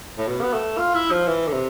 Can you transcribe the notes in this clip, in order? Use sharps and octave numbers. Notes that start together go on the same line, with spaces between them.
A2
B2
B3
A3
F4
E4
F3
E3
D3
C3